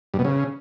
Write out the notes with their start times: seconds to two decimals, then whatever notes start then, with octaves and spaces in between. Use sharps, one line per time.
0.14 G2
0.19 B2
0.25 C#3